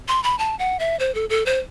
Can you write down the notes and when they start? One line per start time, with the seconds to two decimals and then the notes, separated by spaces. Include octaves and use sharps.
0.08 C6
0.23 B5
0.39 A5
0.59 F#5
0.80 E5
0.99 C5
1.15 A4
1.30 A4
1.46 C5